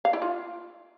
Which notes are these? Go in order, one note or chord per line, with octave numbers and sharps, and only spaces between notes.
F5
E4
F4